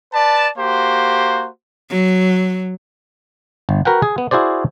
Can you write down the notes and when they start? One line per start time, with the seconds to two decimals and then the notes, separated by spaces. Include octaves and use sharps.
0.13 B4 D5 A5
0.58 A#3 F#4 G4 C5
1.90 F#3
3.69 G1
3.85 F#4 A#4 B4 F#5 G5
4.02 G#4
4.18 B3
4.31 E4 F#4 G#4 C5 D5